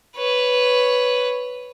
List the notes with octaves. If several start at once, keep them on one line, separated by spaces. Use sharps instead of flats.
B4 C#5